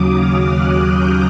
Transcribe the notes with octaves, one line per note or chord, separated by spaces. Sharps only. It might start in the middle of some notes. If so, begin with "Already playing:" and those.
Already playing: D#2 C#3 F#3 D6 D#6
F6
F#6
G6